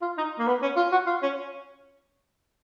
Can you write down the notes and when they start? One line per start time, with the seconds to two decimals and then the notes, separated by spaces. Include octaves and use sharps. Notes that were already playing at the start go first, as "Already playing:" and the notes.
0.02 F4
0.17 D#4
0.39 A#3
0.47 B3
0.62 C#4
0.76 F4
0.92 F#4
1.06 F4
1.22 C#4